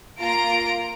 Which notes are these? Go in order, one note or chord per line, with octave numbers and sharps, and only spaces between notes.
A#3 F4 A#5 D7